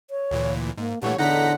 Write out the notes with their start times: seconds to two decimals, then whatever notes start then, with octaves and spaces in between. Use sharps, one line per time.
0.10 C#5
0.31 D2 A#2 E3
0.77 G#2 A#3
1.02 G2 A#2 E3 A3 C#5 F#5
1.18 E2 A2 D3 D#4 F#5 A#5 B6